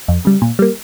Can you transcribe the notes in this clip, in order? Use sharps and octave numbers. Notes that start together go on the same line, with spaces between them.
F2
C#3 G3
A#2
G3 A#3